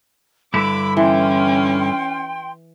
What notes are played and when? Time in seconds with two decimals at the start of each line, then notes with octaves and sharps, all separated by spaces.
0.54 G2 D3 E4 B5 D6
0.97 E3 C#4 G5 C6